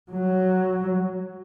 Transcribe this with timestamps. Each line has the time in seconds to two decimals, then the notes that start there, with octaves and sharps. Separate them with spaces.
0.12 F#3